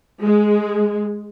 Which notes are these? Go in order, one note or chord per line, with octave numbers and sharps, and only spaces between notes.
G#3